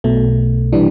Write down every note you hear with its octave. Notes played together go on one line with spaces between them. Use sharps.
B1 B2 A3
C3 E3 G3 D4